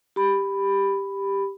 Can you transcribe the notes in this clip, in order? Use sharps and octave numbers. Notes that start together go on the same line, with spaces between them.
G4 B5